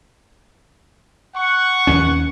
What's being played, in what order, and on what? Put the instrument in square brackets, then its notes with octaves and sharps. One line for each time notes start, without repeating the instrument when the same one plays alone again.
[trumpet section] F#5 C#6
[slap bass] D#2 C#4